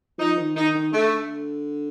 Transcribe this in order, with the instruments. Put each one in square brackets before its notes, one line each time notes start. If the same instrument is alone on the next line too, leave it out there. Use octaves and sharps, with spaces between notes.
[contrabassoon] F3 [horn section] D#4
[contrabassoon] D#3
[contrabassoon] D#3 [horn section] D#4
[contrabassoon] D#3
[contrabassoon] D3 [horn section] A3